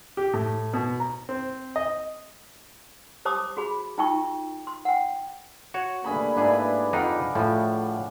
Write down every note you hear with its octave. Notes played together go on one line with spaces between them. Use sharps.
G4
A2
B2
A#5
C4
D#5
G4 C5 A5 D6 D#6
F#4 G#4 B5
D#4 F4 G5 A5 C#6
C6
F#5 G5
F#4 C#5
G2 A3 A#3 G#4 B5
G#2 D4 E4 G#4 B4
F2 D4 D#4 F5 F#5 B5
A2 F3 A3